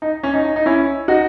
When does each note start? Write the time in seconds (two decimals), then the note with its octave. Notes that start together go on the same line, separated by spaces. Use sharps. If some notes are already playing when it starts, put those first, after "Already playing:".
0.02 D#4
0.23 C#4
0.34 D#4
0.45 D#4
0.56 D#4
0.66 C#4 E4
1.08 D#4 F#4